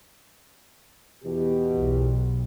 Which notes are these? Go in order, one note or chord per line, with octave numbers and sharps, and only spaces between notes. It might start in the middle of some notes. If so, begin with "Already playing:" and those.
E2 B2 G4
B1